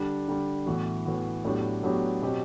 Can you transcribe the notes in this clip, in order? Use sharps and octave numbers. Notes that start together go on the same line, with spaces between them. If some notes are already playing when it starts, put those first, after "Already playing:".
Already playing: D3 G3 D4
D3 G3 D4
A2 E3 B3 F#4
A2 E3 B3 F#4
A2 F#3 B3 D4 G4
A2 F#3 B3 D4 G4
B2 F#3 C4 G4